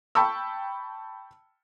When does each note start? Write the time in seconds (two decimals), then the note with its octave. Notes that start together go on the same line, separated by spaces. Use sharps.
0.15 G5 A5 B5 C#6 E6